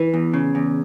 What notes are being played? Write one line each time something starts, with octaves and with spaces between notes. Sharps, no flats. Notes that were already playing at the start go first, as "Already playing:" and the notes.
Already playing: E3 B4
E2
C#3
E2